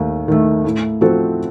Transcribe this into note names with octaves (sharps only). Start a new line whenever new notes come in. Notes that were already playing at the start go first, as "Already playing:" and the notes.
Already playing: D#2 D#3 A3
D#3 A3
A2
F3 C4 F#4 A4